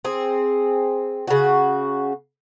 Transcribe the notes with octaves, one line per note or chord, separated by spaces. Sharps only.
C4 G#4
C#3 F#4